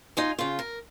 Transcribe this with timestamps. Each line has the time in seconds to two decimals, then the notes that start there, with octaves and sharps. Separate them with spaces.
0.17 D#4 F4 G#5
0.39 C#3 F4
0.59 A#4